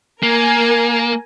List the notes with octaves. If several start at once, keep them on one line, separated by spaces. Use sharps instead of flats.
A#3 A#4 G#5